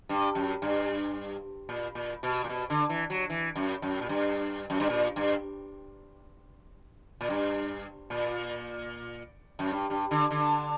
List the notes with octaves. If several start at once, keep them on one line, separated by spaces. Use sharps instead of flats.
G2
F#2
G2
A#2
A#2
B2
A#2
B2
D3
E3
F#3
E3
F#2
F#2
A#2
G2
F#2
G2
A#2
G2
A#2
G2
A#2
F#2
G2
G2
D3
D3